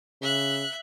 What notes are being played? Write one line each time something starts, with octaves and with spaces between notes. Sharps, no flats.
C#3 E5 F#6